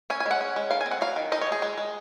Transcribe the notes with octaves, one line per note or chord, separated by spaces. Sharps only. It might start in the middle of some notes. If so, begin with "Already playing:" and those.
C#4 G#5
G#5
G#3
F#5
C#4
G#3
D#3 F5
G#5
C4
F#5
F#3 F5
D#3
D#4 D#5
C#5
G#3
G#4
G#3
G#3